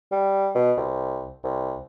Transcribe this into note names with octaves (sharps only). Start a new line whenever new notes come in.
G3
B2
C2
C2